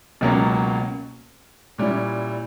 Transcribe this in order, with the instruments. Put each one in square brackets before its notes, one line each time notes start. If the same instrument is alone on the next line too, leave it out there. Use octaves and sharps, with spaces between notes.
[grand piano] C#2 B2 F#3 A#3 C#4
A#2 G3 C#4 E4